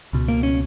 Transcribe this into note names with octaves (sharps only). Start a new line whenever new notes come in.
C#2 B2
A#3
C#4